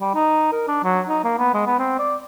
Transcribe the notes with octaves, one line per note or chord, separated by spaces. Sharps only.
G3
D#4
A#4
D4
F#3
D#4
A#3
B3
G#3
B3
C4
D5